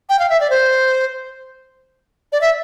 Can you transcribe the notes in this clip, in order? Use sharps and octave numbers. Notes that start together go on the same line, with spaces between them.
G5
F5
E5
D5
C5
D5
E5